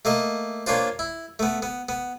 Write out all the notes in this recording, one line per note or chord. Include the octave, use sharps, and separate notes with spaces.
A3 A#3 D#5
A#3 C#4 D4 F4 C5
E4
A3 B3
B3
B3